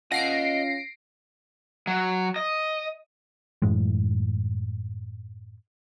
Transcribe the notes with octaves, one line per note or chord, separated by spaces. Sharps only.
C#4 F4 D#5 F#5 A#6 C7 D7
F#3
D#5
F#2 A2 E3 G#3